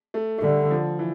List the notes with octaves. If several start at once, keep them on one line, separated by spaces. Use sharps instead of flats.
A3
A3
D3 G3
F3
E3